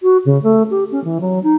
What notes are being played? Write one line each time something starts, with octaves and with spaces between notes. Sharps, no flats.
F#4
C#3
A3
G4
C#4
E3
F#3
D#4